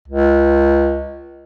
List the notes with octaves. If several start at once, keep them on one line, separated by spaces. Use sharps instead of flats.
C#2